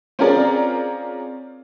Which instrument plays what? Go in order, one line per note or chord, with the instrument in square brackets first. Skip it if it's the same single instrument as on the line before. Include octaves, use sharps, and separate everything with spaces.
[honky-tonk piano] C4 C#4 F4 G#4 A#4 D5